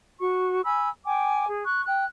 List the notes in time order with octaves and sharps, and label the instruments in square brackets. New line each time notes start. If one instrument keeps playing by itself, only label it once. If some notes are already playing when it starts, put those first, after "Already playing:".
[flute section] F#4 C#6
G#5 B5 E6
G5 G#5 D6
G#4
C#6 F#6
G5 F#6